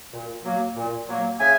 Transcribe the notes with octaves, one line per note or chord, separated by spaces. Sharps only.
A#2
F#3 A#3
A#2
F#3 A#3
C#3 E5 G#5